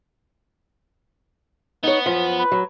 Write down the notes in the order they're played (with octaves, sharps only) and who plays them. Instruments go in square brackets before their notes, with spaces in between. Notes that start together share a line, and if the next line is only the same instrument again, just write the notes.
[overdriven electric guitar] B3 [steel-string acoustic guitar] D#4 C#5
[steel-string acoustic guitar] F#2 F3
[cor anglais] B4
[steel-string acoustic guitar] F#3